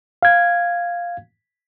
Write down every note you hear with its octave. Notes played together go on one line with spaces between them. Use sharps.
F5 G#6